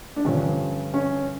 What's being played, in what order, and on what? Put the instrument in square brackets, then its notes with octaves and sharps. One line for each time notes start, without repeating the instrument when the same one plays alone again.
[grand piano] D4
G2 D3 F3 C#4
C#4